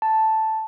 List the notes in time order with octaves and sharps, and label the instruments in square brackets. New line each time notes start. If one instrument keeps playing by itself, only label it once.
[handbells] A5